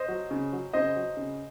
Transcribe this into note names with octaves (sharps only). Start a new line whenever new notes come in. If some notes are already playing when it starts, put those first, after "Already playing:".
Already playing: C5 D#5
F#3
C#3
F#3
C#3 C5 D#5
F#3
C#3